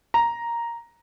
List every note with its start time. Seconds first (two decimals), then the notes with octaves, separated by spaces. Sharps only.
0.14 A#5